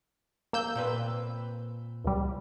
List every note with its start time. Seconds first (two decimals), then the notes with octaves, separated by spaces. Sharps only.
0.53 A#3 E6 G6
0.75 A#2 C4 B4
2.05 C#2 G3